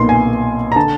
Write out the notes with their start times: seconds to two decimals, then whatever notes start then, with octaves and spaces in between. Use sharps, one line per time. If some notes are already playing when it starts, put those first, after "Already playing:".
Already playing: B1 A#2 C6
0.09 G#5
0.72 A#5
0.76 D3 A5